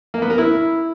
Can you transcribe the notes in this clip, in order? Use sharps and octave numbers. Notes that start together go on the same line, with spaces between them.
A#3
B3
A#4
E4